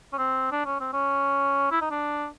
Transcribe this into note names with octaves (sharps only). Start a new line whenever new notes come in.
C#4
C4
D4
C#4
C4
C#4
E4
D#4
D4